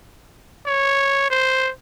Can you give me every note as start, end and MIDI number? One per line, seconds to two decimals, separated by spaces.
0.67 1.27 73
1.30 1.71 72